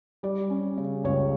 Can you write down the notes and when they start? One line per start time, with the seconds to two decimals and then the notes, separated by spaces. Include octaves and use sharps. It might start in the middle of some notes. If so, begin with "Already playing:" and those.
0.23 G3 D5
0.50 C#4
0.78 C#3
1.04 C#2 C#5